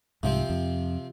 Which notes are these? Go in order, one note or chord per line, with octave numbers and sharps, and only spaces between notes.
C2 G#2 C3 F3 C4
F2